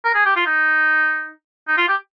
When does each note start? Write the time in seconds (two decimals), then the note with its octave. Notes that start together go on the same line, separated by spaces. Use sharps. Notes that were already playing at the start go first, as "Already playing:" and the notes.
0.05 A#4
0.14 G#4
0.25 G4
0.36 F4
0.46 D#4
1.68 D#4
1.77 F4
1.88 G4